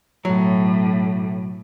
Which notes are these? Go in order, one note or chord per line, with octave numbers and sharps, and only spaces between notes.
B1 A2 F#3